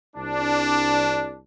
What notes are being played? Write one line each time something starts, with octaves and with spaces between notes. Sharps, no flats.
C2 D4